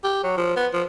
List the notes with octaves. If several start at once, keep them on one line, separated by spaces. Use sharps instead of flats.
G4
F#3
F3
B3
F3